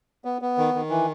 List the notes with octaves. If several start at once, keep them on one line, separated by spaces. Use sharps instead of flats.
B3
B3
D#3
D#3
E3